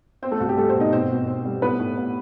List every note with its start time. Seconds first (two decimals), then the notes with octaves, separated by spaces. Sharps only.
0.22 B3 C4 C5
0.32 A3 A4
0.40 C2 F#4
0.49 G4
0.57 G3 A3 A4
0.69 C4 C5
0.75 B2
0.80 D#4 D#5
0.92 B2 C4 C5
1.10 B2
1.28 C4
1.45 G3
1.62 A2 B3 B4
1.79 A2
1.98 B3